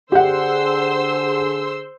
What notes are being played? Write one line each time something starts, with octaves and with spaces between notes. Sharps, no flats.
D3 G4 G#4 C5 F#5 C6 E6